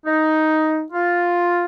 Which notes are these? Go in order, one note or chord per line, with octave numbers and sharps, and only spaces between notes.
D#4
F4